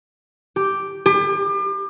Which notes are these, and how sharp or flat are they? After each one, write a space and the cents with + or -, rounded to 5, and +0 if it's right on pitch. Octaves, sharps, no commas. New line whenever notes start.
G4 +0
G4 +35